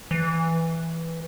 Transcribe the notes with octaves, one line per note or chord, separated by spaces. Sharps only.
E3